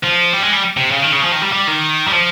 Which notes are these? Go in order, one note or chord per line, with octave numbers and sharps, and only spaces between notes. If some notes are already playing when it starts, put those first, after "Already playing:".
F3
G3
G#3
G3
C3
C#3
D#3
C#3
F3
D#3
G3
G3
D#3
G3
F3